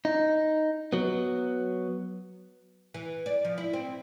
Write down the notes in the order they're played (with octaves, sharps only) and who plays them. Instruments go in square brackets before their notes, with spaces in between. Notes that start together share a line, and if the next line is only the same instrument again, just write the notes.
[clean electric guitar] D#4
F#3 B3
[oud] E3
D5
F3
E4
C4